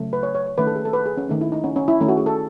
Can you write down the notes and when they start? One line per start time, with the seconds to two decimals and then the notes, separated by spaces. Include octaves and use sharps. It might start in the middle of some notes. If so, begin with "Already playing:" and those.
Already playing: C#3 F#3 A3
0.13 B4
0.23 C#5
0.35 C#5
0.46 C#5
0.58 D#3 A3 C#4 B4
0.67 A4
0.76 G#4
0.85 A4
0.93 B4
1.06 G#4
1.17 C#4
1.28 D#3 A3 C#4 D#4
1.41 E4
1.52 D#4
1.64 C#4
1.76 C#4
1.88 E4
2.00 D#3 A3 C#4
2.08 F#4
2.17 G#4
2.26 A4